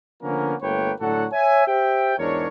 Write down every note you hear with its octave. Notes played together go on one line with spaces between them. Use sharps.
D3 F3 A#3 B3 C#4 A#4
G1 A3 A#3 B4 C#5 G5
A2 D3 F#3 F#4 A4 F#5
C#5 E5 G#5
G4 C5 E5 G5
E2 G#2 D4 A#4 C#5